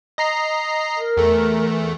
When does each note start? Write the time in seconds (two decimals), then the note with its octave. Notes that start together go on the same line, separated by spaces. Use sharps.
0.18 D#5 A#5 C7
0.97 A#4
1.17 E2 A3